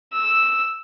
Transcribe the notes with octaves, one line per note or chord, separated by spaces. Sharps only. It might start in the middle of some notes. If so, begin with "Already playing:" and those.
E6